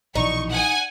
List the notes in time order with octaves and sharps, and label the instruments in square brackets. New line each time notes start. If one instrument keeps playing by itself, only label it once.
[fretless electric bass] A#1 B2 E3 [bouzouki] D#4 [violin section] C#6
[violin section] F#5 G#5